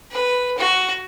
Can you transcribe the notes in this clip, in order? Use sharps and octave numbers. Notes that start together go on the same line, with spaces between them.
B4
F#4